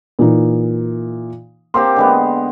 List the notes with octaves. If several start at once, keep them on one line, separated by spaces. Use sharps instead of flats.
A#2 E3 D#4
A#3 C4 G4 C6
D3 G#3 B3